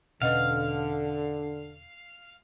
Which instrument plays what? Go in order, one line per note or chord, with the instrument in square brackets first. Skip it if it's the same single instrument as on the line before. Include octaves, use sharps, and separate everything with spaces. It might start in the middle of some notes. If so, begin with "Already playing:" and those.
[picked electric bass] E1 B2 C#4 [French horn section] D3 [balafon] B4 D#5 F#5 [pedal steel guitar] F5